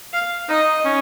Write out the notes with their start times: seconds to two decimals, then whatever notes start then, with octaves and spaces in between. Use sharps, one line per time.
0.13 F5
0.49 D#4 D#5
0.85 C#4